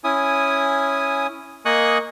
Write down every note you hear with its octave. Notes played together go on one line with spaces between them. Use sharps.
C#4 E4 G#5 D#6
A#3 D#5 G#5 C#6 D#6 F#6